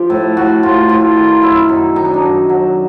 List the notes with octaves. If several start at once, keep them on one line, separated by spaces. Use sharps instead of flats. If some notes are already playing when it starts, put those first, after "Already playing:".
Already playing: F3 G4
A2
A2 F#4
A2 F4
A2 F4
D#3
F#2 E4
F#2 D#4
D#3 D#4
D4
D#4
F#2
F#3